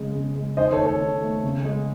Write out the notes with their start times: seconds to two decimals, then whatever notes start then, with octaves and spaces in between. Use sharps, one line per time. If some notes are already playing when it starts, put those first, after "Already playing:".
Already playing: C#3 G#3
0.15 C#3
0.36 G#3
0.57 D#3 C5 D#5
0.72 A4 C#5
0.78 A3
0.86 A4 C#5
1.01 D#3
1.22 A3
1.43 C#3
1.64 G#3